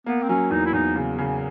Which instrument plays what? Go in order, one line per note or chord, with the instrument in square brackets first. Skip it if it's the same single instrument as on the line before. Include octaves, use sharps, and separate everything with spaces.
[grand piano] A#3 [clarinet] B3
[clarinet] C4
[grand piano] F#3 [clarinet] C#4
[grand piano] E2 [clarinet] D#4
[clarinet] E4
[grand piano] E2 [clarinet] D#4
[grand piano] C#3
C#3